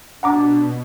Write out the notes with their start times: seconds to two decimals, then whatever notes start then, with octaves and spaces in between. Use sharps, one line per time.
0.23 B2 D4 F#5 A#5 D6